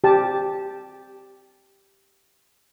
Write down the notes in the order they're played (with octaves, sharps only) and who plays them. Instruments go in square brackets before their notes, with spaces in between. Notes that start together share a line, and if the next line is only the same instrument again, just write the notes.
[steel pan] G4 A5